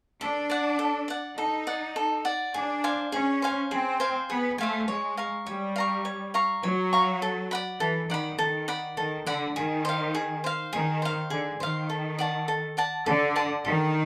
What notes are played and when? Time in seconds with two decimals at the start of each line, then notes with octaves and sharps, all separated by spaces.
0.21 D4 A4
0.50 D5 F#5
0.79 A4
1.08 D5 F#5
1.37 D#4 A4
1.67 D5 F#5
1.96 A4
2.25 D5 F#5
2.54 D4 G#4
2.84 C5 F5 G#5
3.12 C#4 G#4
3.42 C5 F5 G#5
3.71 C4 G#4
4.00 C5 F5 G#5
4.30 B3 G#4
4.58 A3 C5 F5 G#5
4.88 G#3 C#5
5.17 F5 A#5 C#6
5.46 G3 C#5
5.76 F5 A#5 C#6
6.05 C#5
6.34 F5 A#5 C#6
6.63 F#3 C#5
6.93 F5 A#5 C#6
7.22 A4
7.51 D5 F#5 B5
7.80 E3 A4
8.10 D#3 D5 F#5 B5
8.38 D#3 A4
8.68 D5 F#5 B5
8.97 D#3 A4
9.26 D3 D5 F#5 B5
9.56 D#3 G#4
9.85 C5 F5
10.15 G#4
10.44 C5 F5
10.72 D#3 G#4
11.02 C5 F5
11.30 D3 G#4
11.60 D#3 C5 F5
11.90 A4
12.19 D5 F#5 A5
12.48 A4
12.77 D5 F#5 A5
13.06 D3 A4
13.36 D5 F#5 A5
13.65 D#3 A4